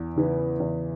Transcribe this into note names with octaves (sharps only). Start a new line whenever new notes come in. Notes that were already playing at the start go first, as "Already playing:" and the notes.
Already playing: E2
C#3 E3 B3
E2